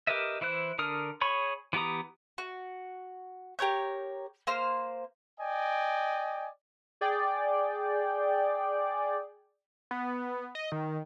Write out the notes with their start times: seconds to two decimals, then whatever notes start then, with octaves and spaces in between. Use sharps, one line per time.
0.07 G4 A#4 B4 D#5 E5
0.41 E3 E4 C5 F#6
0.78 D3 D4 A#4 D#6 F6
1.21 G#4 C#5 B5 C#6
1.73 E3 B3 G4 A#5 D#6
2.38 F#4
3.59 G4 A#4 C#5 G6
4.47 A#3 C5 F6
5.40 D5 D#5 G5 G#5
7.01 G#4 D5 G5
9.91 B3
10.55 D#5
10.72 D#3